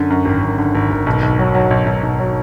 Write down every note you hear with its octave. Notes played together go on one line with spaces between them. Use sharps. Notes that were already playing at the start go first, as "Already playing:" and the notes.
Already playing: F#2 D3
F#2
G#1
F#2
D3
G#1
G#1
B1
B1
F#3
F#3
B1
B1
B1
F#3